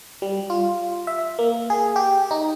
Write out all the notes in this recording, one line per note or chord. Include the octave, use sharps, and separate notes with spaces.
G3
F4
E5
A#3
G#4
G4
D#4